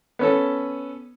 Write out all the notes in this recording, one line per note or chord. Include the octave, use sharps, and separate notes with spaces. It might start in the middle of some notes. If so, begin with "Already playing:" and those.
B3 C#4 A4